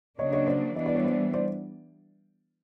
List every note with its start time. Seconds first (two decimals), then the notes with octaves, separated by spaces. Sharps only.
0.19 C#3 F#3 A#3 D4 C#5 D#5
0.33 C#5 D#5
0.48 C5 D5
0.76 E3 G3 B3 D4 D#5
0.86 D5
0.95 C#5
1.05 C5 D5
1.34 C5 D5